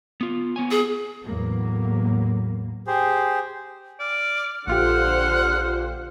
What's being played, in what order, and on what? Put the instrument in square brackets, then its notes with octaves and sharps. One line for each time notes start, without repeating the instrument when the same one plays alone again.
[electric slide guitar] B3 F4
B3 C#5 G#5
[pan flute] G#4
[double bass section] E2 A2 F#3 A#3 B3
[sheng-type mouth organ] G4 G#4 C5
[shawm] D5 [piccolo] F6
[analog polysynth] A#1 F4 G4 [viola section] D3 C5 [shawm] F#5 [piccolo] F6